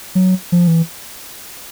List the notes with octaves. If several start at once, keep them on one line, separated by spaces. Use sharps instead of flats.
F#3
F3
E3